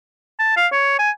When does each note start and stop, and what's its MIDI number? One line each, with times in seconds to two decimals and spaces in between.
0.39 0.53 81
0.57 0.67 77
0.72 0.98 73
0.99 1.10 80